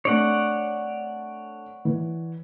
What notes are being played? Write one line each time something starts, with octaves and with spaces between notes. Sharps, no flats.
A3 C4 D4 C#5 D5 F#5
E3